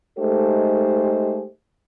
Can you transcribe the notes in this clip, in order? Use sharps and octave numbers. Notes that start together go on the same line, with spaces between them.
G#3 A3 D#4 G4 A4 C5